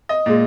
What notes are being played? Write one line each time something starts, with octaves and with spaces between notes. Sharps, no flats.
D#5
A#2 G#3